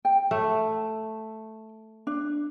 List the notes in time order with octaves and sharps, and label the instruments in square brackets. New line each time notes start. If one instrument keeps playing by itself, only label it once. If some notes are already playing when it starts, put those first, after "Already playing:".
[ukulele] G5
[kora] A3
[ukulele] D4